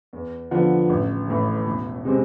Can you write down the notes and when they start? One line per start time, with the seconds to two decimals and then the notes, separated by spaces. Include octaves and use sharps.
0.13 E2
0.51 D3 F3 B3
0.89 A1
1.28 A2 E3
1.66 E1
2.05 C3 G#3 C4